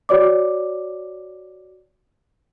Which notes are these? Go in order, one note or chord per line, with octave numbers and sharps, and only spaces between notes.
F#4 C#5 D5 D6